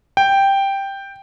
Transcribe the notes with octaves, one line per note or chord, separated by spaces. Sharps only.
G5